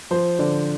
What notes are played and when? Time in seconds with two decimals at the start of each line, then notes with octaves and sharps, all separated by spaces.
0.11 F3 C5
0.39 D3 D5